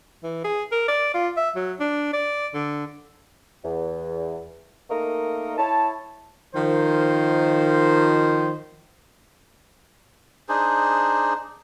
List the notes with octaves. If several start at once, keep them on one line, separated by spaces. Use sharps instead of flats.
E3
G#4
A#4
D5
F4
E5
F#3
D4
D5
D3
E2
A3 A#3 D#4 A#4 D#5
E4 C#5 A5
D#3 F3 C5
D4 D#4 G#4 C5